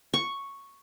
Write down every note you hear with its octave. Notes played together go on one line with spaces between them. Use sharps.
C#6